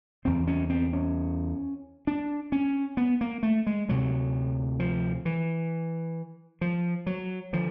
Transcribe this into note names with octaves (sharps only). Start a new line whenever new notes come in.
E2 C#3 C4
C#4
C4
C#4
D4
C#4
B3
A#3
A3
G#3
D2 C3 F#3
F3
E3
F3
F#3
D3 F3